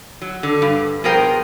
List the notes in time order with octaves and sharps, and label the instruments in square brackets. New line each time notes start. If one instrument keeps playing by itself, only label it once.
[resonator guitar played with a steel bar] F#3
D3
G2
B2 F3 G#4 A#4 C5 G5